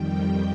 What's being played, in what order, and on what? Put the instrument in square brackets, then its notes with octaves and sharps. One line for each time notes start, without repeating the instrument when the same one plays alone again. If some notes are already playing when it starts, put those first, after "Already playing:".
Already playing: [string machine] F2 D#3 G3 G5